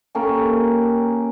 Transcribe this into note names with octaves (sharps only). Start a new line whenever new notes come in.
A#3 C#4 G4 A4